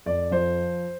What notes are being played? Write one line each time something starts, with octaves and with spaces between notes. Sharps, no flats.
F2 D5
F3 C5